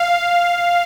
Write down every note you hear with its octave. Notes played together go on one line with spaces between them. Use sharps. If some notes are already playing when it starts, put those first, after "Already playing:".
Already playing: F5